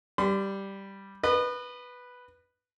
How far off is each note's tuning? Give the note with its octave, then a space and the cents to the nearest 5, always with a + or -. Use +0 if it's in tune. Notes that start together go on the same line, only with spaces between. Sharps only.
G3 +0 B5 +45
B4 +0 D#5 -35